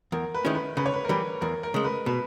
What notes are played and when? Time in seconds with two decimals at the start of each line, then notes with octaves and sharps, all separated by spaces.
0.12 E2 A#4
0.34 B4
0.45 D#3 G#3 C#4 E4
0.55 B4
0.77 C#3 B4
0.86 C#5
0.94 B4
1.05 A#4
1.09 E3 G3 B4
1.41 E2 A#4
1.63 A#4
1.74 C#3 G#3
1.84 B4
2.06 B2 B4